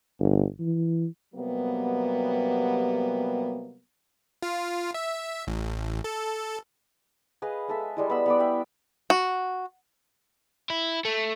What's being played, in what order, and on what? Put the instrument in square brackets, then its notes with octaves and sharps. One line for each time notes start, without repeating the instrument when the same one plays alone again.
[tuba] G1
E3
[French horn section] C3 F#3 G3 A#3 B3
[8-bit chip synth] F4
E5
A1
A4
[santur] G#4 B4 D#5 F5
G#3 A4 E5
G3 G#3 E4
B3 B5 E6
B3 B4 D5
E5 G5 B5
[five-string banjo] F#4
[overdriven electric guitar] E4
A3